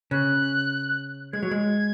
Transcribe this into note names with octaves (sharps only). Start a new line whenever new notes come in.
C#3 F#6
G#3 G#6
F#3
G#3